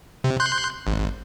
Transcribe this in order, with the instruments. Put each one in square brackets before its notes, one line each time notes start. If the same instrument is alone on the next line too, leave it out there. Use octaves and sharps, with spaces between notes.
[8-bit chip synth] C3
C6 F#6 G6
G#1